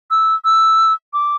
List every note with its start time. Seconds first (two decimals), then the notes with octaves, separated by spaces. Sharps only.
0.11 E6
0.45 E6
1.13 D6